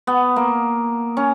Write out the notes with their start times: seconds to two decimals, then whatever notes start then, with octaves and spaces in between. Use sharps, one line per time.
0.07 B3
0.36 A#3
1.17 C#4